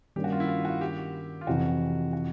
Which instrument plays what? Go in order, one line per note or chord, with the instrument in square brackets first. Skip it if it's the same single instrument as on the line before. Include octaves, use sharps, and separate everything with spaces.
[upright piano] G2 D#3 G3 A#3 C#4 [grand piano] G4
[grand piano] F#4
F4
E4
F4
F#4
G4
F4
[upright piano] F2 C3 E3 [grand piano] F#4
[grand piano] F#4